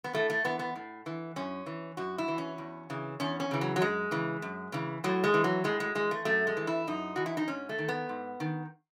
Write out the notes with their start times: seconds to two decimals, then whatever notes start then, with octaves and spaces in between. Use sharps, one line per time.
0.04 B3
0.13 A2 A3
0.30 A3
0.44 E3 B3
0.59 B3
0.76 A2
1.06 E3
1.36 F#2 C#4
1.66 E3
1.97 F#2 F#4
2.18 E4
2.28 E3
2.38 C#4
2.58 E2
2.90 C#3 E3
3.20 E2 C#4
3.40 C#4
3.51 C#3 E3
3.61 F#3
3.76 F#3
3.81 F#2 G#3
4.11 C#3 E3
4.42 F#2
4.72 C#3 E3
5.04 A2 F#3
5.24 G#3
5.34 E3
5.44 F#3
5.64 A2 G#3
5.80 G#3
5.95 E3 G#3
6.11 A3
6.25 F#2 A3
6.47 G#3
6.57 E3
6.67 E4
6.87 F#2 D#4
7.16 E3 F#4
7.26 E4
7.37 D#4
7.48 G#2 C#4
7.69 A3
7.78 D#3
7.89 B3
8.09 G#2
8.40 D#3